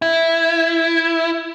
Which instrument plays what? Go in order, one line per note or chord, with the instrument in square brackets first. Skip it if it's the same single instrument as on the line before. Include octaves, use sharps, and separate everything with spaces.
[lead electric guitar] E4